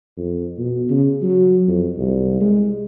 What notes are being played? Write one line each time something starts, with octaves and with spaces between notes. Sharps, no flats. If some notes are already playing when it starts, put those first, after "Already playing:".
F2
B2
C#3
F#3
F2
C2
G#3